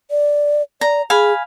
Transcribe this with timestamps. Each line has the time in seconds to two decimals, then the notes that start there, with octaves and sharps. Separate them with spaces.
0.11 D5
0.81 D5 A#5
1.10 G#4 F5 G#5 B5